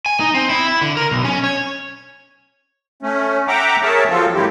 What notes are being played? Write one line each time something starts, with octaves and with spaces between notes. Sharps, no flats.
G#5
D#4
C4
E4
E4
D3
A#4
B1
C#4
C#5
A3 C#4
E5 F#5 G5 A#5 D6
G#4 A#4 C#5 E5 A5
F3 F#3 C4 F4 A4
G#2 D#3 F#3 C4 E4 G4